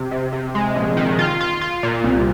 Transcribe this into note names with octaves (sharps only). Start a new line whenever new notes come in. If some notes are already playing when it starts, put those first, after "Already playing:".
Already playing: C3
C3
C3
G#3
A#1
D#3
F4
F4
F4
A#2
C2